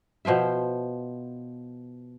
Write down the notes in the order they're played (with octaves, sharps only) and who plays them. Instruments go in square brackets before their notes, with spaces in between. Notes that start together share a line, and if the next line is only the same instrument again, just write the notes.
[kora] B2 F3 C5 E5